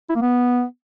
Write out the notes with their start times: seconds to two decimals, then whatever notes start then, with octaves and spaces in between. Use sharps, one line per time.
0.09 E4
0.15 A#3
0.21 B3